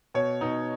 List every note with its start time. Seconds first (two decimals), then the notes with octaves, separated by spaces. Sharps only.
0.14 B2 C#5
0.41 B2 D#4